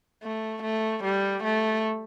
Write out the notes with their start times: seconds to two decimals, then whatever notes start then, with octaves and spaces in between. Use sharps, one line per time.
0.24 A3
0.63 A3
1.04 G3
1.44 A3